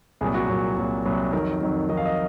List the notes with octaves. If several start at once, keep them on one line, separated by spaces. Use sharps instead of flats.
C2 A#2 F#3 G#4
F#4
C2 A#2 F#3
C2 A#2 F#3
C2 A#2 F#3
F2 D#3 F#3 A#4
F2 D#3 F#3
F2 D#3 F#3 D#5
F5
D#5